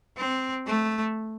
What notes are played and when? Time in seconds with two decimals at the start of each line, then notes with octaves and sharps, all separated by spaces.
0.18 C4
0.67 A3